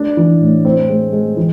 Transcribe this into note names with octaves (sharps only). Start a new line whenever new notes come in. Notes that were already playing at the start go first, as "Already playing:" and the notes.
Already playing: D4
E3
A2
C4
G#3
G#3
E3